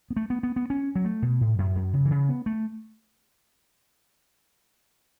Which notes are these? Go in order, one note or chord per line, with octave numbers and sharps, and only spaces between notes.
B3
A3
B3
B3
B3
C#4
F#3
A3
B2
A2
F#2
F#2
C#3
E3
C#3
B3
A3